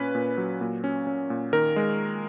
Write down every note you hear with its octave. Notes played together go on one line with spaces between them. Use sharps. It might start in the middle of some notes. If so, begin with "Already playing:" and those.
Already playing: A#2 C#4 B4
A#2
F#3
A#2
C#4
C#4
A#2
D#3 A#4
G#3